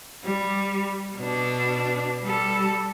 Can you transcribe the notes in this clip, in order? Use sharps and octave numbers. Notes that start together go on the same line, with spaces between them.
G3
B2 D4
G3 A4